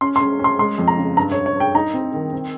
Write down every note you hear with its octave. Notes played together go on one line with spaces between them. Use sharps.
C#4 C6
C6
C#4
C#4
C6
G#3 C6
F2
A#5
C#3
G2 A#5
C#5
G2
C#5
G2 G5
D#4 A#5
C4
D#3
C4